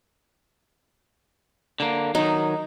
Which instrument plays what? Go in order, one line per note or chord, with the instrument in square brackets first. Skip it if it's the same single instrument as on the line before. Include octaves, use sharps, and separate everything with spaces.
[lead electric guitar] D3 A#3
[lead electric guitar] D#3 F#3 [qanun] D#4